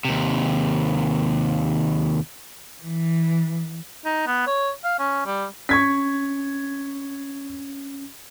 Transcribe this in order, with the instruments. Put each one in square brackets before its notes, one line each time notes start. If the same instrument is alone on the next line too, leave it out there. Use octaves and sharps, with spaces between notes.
[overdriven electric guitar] D#2 C3
[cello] E3
[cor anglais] D#4
B3
C#5
F5
C#4
G3
[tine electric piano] C#4 [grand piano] C#6 G#6 B6